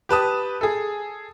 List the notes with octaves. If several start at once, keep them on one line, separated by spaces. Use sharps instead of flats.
G4 B4 A5 D#6
G#4 A4